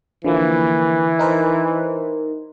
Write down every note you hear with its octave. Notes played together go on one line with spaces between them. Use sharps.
D3 E3 F3 A#3
D#4 A#4 C5